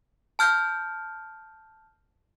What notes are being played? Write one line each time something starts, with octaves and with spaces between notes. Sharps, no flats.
A5 F6 G6